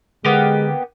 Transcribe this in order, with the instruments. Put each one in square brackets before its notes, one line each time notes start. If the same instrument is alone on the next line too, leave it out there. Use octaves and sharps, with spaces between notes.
[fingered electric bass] D3 [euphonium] G#3 [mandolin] A#3 B3 G4